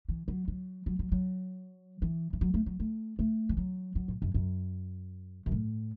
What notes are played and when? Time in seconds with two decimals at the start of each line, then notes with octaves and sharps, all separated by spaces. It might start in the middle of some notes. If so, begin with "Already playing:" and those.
0.08 E3
0.28 F#3
0.48 F#3
0.86 F#3
0.99 F#3
1.12 F#3
2.02 E3
2.33 E3
2.41 F#3
2.54 A3
2.66 F#3
2.80 A3
3.19 A3
3.49 E3
3.57 F#3
3.95 F#3
4.08 A2
4.22 F#2
4.34 F#2
5.46 F#2
5.51 A2